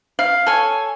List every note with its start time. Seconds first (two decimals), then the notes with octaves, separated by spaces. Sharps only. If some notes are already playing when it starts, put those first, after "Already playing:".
0.19 F5
0.46 A4 C#5 G#5